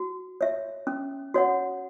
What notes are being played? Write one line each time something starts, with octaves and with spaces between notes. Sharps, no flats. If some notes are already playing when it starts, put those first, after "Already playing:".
Already playing: F#4
C#5 E5
C#4
F#4 C#5 F#5